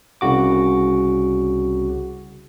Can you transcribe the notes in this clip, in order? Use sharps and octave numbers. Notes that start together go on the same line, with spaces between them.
C2 C#3 F#4 D6